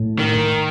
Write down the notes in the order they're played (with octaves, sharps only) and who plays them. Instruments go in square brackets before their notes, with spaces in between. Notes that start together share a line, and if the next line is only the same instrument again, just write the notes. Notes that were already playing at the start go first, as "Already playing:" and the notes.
Already playing: [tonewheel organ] A2
[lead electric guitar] D#3